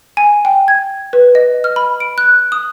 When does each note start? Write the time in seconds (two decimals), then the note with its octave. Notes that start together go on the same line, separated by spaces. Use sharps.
0.17 G#5
0.45 G5
0.68 G#6
1.13 B4
1.35 D#5
1.64 F6
1.76 B5
2.00 D7
2.18 F#6
2.52 D#6